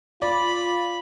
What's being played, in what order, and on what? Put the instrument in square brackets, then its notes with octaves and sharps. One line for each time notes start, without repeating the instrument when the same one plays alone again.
[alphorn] F4 [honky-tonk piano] D5 [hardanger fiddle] B5